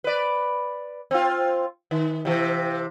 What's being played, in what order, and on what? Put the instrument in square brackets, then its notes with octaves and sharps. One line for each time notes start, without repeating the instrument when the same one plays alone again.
[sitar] B4 D5
C4 F4
D#3
C3 E3